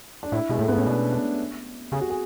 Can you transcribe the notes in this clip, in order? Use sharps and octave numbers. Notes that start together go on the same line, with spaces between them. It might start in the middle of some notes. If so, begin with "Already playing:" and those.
D4
A2 E4
B2 G#3
A2 A3
G#2 B3
A2 C#4
B2 D4
D4
C#3 G#4
F#4
G#4